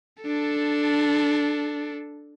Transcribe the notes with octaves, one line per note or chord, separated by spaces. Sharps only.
D4 A4